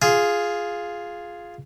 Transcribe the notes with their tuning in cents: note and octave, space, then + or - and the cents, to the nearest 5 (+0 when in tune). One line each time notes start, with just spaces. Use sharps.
F4 +0 G#4 +0